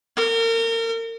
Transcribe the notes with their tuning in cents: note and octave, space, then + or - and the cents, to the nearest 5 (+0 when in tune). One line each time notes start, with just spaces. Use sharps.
A#4 -35